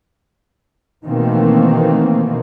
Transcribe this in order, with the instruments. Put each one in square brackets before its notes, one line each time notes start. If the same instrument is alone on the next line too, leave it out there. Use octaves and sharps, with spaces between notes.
[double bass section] B2 D#3 E3 A3 A#3 C4